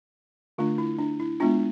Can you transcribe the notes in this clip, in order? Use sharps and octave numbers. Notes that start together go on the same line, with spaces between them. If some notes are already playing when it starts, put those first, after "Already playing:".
D3 A3 D4 F4
E4
D4
E4
G#3 B3 D4 F4